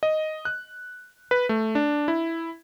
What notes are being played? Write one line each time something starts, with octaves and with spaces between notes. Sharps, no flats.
D#5
F#6
B4
A3
D4
E4